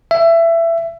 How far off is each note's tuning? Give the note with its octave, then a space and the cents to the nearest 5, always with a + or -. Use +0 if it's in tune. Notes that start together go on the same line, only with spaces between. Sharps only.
E5 +20